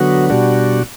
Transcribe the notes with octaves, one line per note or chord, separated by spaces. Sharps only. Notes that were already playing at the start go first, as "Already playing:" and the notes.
Already playing: D3 F#3 B3 F#4
B2 G3 D4 F#4